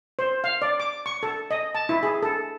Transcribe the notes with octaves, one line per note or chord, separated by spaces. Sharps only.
C5
F5
D5
D6
C#6
A4
D#5
A5
E4
G#4
A4